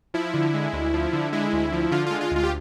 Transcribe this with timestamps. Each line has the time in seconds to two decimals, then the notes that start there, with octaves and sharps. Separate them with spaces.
0.14 F3 E4
0.34 D3
0.54 G#3
0.73 D2
0.94 F3
1.13 D3
1.33 G#3 E4
1.53 D2
1.72 F3
1.92 D3 F4
2.06 G#3 F4
2.21 F4
2.31 D2 F4
2.43 G4